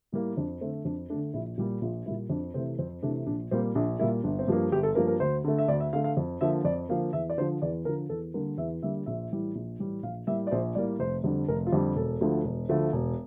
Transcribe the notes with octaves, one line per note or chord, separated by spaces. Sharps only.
A2 G3 A#3
F2 D4
D3 A3 C4
F2 D4
D3 A3 D4
A#1 E4
A#2 G3 A#3 E4
A#1 F4
A#2 G3 A#3 E4
F2 D4
C3 E3 A3 C4
F2 C4
C3 E3 A3 D4
A#1 D4
A#2 G3 A#3 C4
A#1 D4
A#2 G3 A#3 E4
G1 D4
C4
G2 F3 A#3 D4
G1 G4
A4
G2 F3 A#3 A#4
A#4
D2 C5
D3 A3
E5
D2 D5
E5
D3 A3 F5
F5
F2
D3 F3 A#3 E5
F2 D5
D3 F3 A#3 F5
E2 E5
D5
D3 F3 C5
E2 D5
D3 F3 A#4
E2 A4
D3 G3 A#3 A#4
E2 E5
D3 G3 A#3 E5
A#1 E5
A2 E3 G3
A#1
A2 E3 G3
A#1 F5
A2 G3 A#3 E5
D5
A#1 C5
A2 G3 A#3 D5
F1 C5
F2 D3 G3
F1 A#4
F4
F2 D3 G3 G4
E1 A4
D2 D3 F3 A3
E1
D2 D3 F3 A3
E1